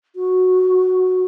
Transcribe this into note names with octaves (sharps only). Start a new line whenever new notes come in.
F#4